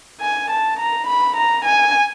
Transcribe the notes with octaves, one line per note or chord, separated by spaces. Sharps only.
G#5
A5
A#5
B5
A#5
G#5